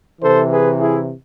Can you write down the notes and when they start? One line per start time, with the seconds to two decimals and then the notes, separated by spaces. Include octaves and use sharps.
0.21 C3 E3 A4 C5
0.50 G#4 B4
0.79 E4 G#4